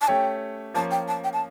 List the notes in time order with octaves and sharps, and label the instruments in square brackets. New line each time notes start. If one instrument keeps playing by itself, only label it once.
[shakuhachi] A5
[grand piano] A3 C#4 G4 C#5 [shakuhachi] G5
[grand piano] F3 A#3 C#4 [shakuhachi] A5
[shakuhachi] G5
A5
G5
A5